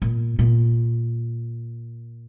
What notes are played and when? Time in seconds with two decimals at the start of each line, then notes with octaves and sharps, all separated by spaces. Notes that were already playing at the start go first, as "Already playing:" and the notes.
0.02 A#2
0.39 A#2